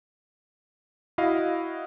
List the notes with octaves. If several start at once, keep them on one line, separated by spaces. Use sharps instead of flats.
E4 F#4 D#5 F5